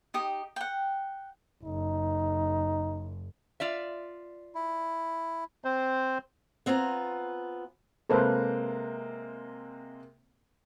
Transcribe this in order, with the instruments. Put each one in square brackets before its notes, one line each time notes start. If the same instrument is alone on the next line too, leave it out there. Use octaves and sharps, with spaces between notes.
[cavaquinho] D#4 G4 D#6
F#5 G5
[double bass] F#1 [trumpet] D#4
[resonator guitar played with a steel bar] F4 D5 E5
[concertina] E4
[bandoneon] C4 C5
[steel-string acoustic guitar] B3 C4 F4 G#5 A#5
[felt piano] C3 G#3 A#3 [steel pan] A4 B4 C5